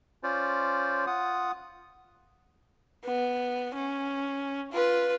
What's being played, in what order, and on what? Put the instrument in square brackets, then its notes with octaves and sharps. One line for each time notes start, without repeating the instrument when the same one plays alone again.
[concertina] C#4 F4 C5 D5
F4 F#5 D#6
[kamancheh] B3
C#4
F4 B4